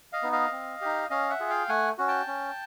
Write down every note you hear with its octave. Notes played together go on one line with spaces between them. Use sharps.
D#5 F5
B3 D#4
D#5 F5
C4
D#4 G4
C#4 D#5 F5
E5 F#5
F4 G#4
F5 G5
A3 F#5 G#5
C#4 F#4
G5 A5
C#4